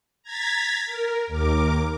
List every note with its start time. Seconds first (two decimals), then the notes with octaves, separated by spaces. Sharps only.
0.23 A#5 G#6 A6 B6
0.86 A#4
1.27 D#2 A#4 D6